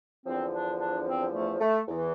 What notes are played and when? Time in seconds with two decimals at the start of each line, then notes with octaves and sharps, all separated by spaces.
0.25 E2 D3 F3 C4
0.52 D4
0.80 D4
1.06 C4
1.33 A3
1.61 A3
1.88 E2 E3